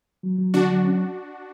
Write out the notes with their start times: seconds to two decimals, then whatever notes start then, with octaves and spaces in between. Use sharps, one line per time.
0.23 F#3
0.39 F#3
0.54 D3 D4 F#4
0.70 F#3
0.85 C#4